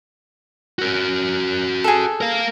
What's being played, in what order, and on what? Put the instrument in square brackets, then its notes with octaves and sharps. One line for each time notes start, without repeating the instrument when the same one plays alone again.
[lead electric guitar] F#4 A#4
[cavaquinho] G#4 A4
[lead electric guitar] A#4 F5